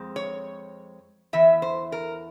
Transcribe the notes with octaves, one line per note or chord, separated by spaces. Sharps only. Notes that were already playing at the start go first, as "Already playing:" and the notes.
Already playing: F2 G#3 C4
C#5
E2 E3 E5
C5
A#4